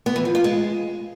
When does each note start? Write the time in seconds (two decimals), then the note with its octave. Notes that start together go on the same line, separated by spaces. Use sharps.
0.06 B3
0.16 E3
0.25 F3
0.35 F4
0.44 G#3